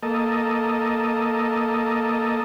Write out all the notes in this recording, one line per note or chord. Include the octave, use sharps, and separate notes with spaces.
A#3 A4 D#5